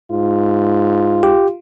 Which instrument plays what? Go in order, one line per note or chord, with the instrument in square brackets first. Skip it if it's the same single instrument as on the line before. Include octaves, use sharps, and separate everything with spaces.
[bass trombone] G#2 [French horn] F4
[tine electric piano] G4